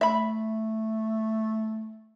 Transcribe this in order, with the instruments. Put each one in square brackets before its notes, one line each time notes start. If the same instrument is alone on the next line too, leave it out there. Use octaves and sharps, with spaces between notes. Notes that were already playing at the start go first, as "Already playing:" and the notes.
[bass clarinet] A3 [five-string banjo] E5 B5